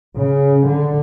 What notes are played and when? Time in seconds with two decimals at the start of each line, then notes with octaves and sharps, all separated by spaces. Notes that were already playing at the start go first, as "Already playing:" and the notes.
0.18 C#3
0.68 D3